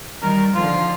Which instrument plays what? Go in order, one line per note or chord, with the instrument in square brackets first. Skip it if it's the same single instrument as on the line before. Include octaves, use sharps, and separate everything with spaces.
[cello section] D#3 G3 [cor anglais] A#4
[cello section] D3 D#3 F3 [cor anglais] F4